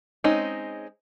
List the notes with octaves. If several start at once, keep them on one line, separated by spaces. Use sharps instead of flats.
G#3 C4 C#4 D#4